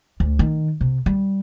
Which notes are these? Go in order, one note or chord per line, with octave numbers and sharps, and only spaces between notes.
D2
D#3
C3
G3